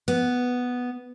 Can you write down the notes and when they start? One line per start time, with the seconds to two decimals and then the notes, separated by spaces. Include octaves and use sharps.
0.08 B3